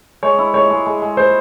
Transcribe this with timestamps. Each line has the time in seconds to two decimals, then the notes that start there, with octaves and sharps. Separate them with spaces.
0.23 G#3 C#5
0.38 E4
0.54 G#3 C#5
0.70 G#3
0.86 G#3
1.02 G#3
1.17 G#3 C5